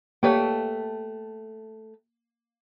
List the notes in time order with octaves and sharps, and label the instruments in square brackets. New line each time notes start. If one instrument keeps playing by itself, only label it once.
[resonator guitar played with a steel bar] A3 B4 G5 [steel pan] A#3 G4 C#5